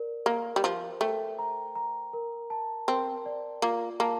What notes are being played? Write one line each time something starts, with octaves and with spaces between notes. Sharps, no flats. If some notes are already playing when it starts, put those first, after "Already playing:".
Already playing: A#4 D5
A#3 A#4
G3
F3 C5
A3 G5
A#5
A#5
A#4
A5
C4 A#4
D5
A#3 F4
A#3 A5